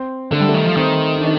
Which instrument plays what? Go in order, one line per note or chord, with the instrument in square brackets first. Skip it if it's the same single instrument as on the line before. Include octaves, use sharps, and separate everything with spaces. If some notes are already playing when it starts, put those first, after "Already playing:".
Already playing: [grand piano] C4
[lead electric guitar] D3 [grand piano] A3
[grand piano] G3
A3
[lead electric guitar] D#3
F3
[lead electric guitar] D#3 [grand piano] C4
[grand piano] D#4
D4